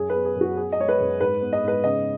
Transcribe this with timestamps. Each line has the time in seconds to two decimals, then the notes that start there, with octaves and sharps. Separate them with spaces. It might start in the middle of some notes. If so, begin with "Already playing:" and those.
Already playing: F#2 G#4
0.10 B4
0.15 B3
0.25 G#4
0.36 F#2
0.41 F#4
0.57 B3 G#4
0.72 D#5
0.78 G#3 C#5
0.89 B4
1.00 F#2
1.21 G#2 B4
1.42 B3
1.53 D#5
1.63 G#2 B4
1.84 C#3 D#5